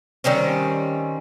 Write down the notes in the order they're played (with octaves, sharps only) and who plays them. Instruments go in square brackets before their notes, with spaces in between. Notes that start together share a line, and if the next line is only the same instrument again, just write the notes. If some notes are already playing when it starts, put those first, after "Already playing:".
[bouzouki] D#3 G3 C4 C#4